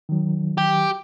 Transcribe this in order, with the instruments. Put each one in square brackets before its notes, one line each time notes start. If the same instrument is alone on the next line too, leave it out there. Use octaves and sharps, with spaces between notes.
[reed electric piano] D#3 F#3
[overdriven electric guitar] G4